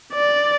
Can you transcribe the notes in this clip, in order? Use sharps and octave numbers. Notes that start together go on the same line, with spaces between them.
D5